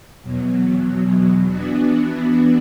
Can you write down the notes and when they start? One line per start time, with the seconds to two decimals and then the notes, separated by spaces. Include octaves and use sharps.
0.23 E2 B2 F#3
1.46 E3 B3 D4 F#4